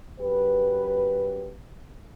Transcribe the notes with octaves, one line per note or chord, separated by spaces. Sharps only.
F#2 G4 B4